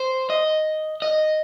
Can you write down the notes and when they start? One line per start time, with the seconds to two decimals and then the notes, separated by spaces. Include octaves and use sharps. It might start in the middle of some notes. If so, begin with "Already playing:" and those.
Already playing: C5
0.30 D#5
1.02 D#5